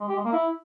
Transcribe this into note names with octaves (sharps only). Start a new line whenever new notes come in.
G#3
G4
G#3
A#3
E4